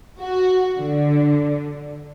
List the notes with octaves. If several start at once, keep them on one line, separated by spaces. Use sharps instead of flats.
F#4
D3